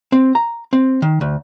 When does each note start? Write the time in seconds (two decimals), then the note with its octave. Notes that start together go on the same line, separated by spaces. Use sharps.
0.12 C4
0.35 A#5
0.73 C4
1.02 D#3
1.21 D2